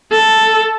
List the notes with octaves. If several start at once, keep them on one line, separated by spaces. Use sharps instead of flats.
A4